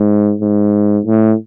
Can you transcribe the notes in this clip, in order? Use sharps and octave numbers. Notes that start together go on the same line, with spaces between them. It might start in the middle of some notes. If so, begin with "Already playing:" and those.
Already playing: G#2
G#2
A2